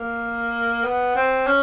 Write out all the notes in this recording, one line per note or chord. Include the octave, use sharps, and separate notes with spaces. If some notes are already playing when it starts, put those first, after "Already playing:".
Already playing: A#3
B3
C4
C#4